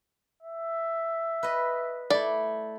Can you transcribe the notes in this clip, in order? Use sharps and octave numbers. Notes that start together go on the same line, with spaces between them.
E5
B4 D#5
A3 E4 D5